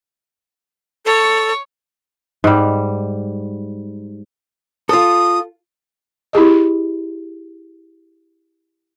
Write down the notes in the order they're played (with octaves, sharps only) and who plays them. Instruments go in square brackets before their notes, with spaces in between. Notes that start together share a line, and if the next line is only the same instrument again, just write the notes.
[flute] A4 [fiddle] C#5
[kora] G#2 G3
[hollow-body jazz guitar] F4 A4 [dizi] D#6
[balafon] E4 G4 G#4 D#5